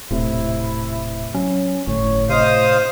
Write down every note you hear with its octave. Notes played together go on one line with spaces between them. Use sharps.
D#1 A2 C3 E4
F#3 C#4
G1 A2 C#5
C3 C5 D#5 F5 D#6